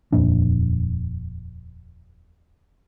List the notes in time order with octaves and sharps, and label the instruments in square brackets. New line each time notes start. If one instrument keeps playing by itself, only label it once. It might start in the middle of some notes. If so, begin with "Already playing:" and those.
[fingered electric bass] D#1 F2 A#2 D4